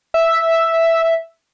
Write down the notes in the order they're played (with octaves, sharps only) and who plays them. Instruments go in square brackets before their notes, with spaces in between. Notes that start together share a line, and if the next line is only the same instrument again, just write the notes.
[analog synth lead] E5